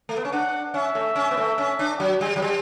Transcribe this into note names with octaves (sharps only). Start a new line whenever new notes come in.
A3
B3
C#4
D4 F#5
C#4 E5
A3
C#4
B3
A3
C#4
D4
F#3
G3
F#3
G3